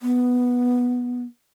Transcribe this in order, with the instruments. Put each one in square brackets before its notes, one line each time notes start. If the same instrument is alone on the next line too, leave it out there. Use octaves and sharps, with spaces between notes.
[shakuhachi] B3